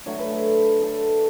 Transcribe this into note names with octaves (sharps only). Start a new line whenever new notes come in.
D3 F#3 A3 C#5
B4
A4
A4